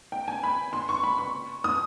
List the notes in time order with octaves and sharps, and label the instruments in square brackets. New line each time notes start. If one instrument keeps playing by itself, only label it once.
[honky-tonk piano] G5
G#5
B5
C6
C#6
B5
C#6
D#6